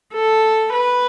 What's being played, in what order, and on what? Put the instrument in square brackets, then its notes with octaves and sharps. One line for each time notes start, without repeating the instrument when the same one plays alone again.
[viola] A4
B4